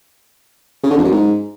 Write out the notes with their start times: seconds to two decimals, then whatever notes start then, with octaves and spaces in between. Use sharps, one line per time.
0.83 C#3
0.90 D3
0.97 F2
1.04 F#2
1.11 G#2